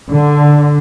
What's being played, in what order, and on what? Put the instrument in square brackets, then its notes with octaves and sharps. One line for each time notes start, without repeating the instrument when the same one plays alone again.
[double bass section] D3